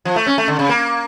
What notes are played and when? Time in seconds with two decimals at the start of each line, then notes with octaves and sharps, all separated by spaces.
0.05 F3
0.16 A3
0.26 C#4
0.38 A3
0.48 D3
0.59 C#3
0.69 A#3